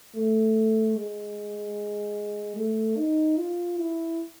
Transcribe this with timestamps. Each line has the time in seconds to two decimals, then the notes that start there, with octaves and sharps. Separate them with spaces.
0.15 A3
0.96 G#3
2.57 A3
2.97 D#4
3.37 F4
3.78 E4